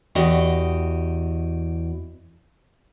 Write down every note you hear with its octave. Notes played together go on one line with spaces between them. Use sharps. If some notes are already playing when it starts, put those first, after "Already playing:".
E2 F#4 G4 D#5